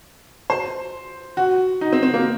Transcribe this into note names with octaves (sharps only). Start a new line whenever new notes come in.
C5
F#4
D#4
C4
C4
A#3